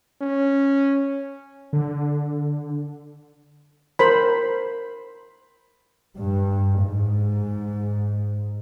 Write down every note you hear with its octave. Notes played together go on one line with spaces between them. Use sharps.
C#4
D3
A#4 C5 B5
G2
G#2